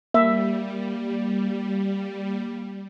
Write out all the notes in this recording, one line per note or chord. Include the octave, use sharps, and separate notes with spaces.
G3 A#3 E5